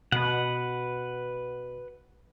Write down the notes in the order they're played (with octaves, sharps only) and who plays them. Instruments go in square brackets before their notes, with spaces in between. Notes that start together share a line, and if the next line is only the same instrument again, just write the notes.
[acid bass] B2 [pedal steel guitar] B4 F#5